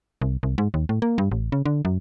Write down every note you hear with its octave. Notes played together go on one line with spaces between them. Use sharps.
C2
C2
G#2
D#2
A2
A#3
G2
A1
C#3
D3
F#2